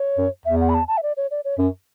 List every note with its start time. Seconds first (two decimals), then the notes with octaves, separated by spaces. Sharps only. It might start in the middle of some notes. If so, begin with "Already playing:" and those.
Already playing: C#5
0.18 F#2
0.45 E2 E5
0.61 F#5
0.69 B5
0.74 A5
0.88 A5
0.97 E5
1.03 D5
1.17 C#5
1.31 D5
1.45 C#5
1.59 F#2